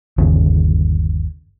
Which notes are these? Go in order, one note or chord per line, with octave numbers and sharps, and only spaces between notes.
G1 D#2 C#3